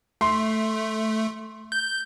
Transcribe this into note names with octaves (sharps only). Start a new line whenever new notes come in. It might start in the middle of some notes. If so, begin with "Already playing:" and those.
A3 C6
G6